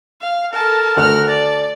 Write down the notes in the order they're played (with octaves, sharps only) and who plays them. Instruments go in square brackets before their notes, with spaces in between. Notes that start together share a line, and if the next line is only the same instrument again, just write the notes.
[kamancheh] F5
[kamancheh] A4 A5 [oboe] A#4
[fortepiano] D2 A3 [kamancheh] F#5 F6
[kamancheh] D5 [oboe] A5